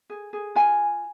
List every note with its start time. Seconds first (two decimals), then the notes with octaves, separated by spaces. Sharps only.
0.10 G#4
0.33 G#4
0.55 F4 G#5